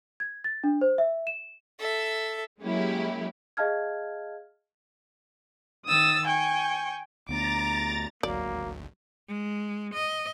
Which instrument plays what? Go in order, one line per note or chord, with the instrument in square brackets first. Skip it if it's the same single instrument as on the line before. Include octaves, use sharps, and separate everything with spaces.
[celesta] G#6
A6
D4
C5
E5
E7
[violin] A4 E5
[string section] F#3 G#3 A#3 C#4 E4 G4
[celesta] G#4 D#5 F5 A5 F6 G#6
[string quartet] D#3 D#6 E6 A6
G5 G#5 C#6
[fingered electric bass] D2 B3 D4 [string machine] A#5 A6 [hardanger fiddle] D6
[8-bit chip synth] G#1 D2 [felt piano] F#3 [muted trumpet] A#3 [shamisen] D5
[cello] G#3
D#5